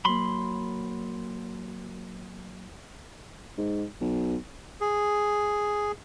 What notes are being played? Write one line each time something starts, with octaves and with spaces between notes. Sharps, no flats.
F#3 A#3 B5 C6
G#2
B1
G#4